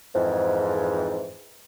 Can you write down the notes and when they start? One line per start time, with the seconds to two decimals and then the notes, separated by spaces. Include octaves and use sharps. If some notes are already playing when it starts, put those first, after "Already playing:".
0.14 F2 G#2 E3